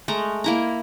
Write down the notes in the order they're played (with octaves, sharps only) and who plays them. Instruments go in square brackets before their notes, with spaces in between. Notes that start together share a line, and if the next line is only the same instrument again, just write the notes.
[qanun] G#3 A3 A#5
A#3 E4 A#5